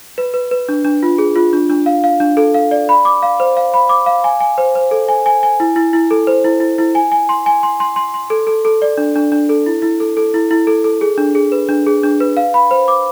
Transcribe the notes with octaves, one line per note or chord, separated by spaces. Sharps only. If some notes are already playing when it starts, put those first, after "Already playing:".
B4
B4
B4
D4
D4
F4
G#4
F4
D4
D4
F5
F5
D4
A4
F5
D5
B5
D6
F5
C5
F5
B5
D6
F5
G#5
G#5
C5
C5
A4
G#5
G#5
G#5
E4
E4
E4
A4
C5
E4
E4
E4
G#5
G#5
C6
G#5
C6
C6
C6
C6
A4
A4
A4
D5
D4
D4
D4
A4
E4
E4
A4
A4
E4
E4
A4
A4
G#4
D4
G#4
B4
D4
G#4
D4
B4
F5
B5
C5
D6